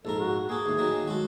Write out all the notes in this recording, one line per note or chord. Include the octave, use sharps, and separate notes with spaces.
A#1 G#2 A4 A#4
F#4
A#3 G#4 A4
D#2 A2
D#3 F#3 A#3
G#3 F#4 A4